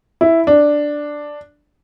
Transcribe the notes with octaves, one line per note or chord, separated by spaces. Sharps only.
E4
D4